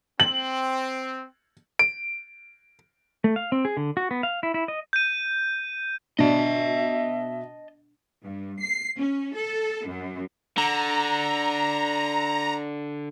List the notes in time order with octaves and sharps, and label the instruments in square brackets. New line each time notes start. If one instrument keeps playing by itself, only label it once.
[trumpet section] C4 [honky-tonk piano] F#7
[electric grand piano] D7
[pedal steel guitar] A3
F5
C4
G#4
D3
F#4
B3
F5
E4
E4
D#5
[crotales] G6 D#7
[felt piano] B2 [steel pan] D4 [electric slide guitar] D#5 A5 [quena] E5
[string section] G2
C7
C#4
A4
F#2
[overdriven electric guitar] D3 [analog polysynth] A#5